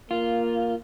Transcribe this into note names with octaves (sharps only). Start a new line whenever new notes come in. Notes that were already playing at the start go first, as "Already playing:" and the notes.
A#3 F4